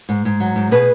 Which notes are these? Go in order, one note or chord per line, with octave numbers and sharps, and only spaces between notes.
G#2
G#2
F#3
G#2
B2 G#4 B4